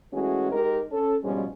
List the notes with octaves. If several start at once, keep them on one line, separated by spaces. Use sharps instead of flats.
E3 G#3 A3 C#4 F#4 G#4
G#3 D#4 G4 A#4
C#4 A4
G#2 B2 F3 G3 G#3 C#4